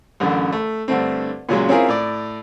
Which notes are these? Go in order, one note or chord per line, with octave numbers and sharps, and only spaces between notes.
A1 F#2 D3
A3
G2 D3 A3 C4
A#2 C#3 F#3 G#3
C4 C#4 E4 F4 G#4 A#4
A2 D5